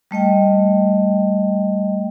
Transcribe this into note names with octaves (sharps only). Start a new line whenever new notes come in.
G3 A3 D#5 G5